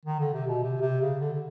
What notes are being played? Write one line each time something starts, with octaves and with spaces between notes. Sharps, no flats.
D#3
D3
C3
B2
C3
C3
C#3
D3
D3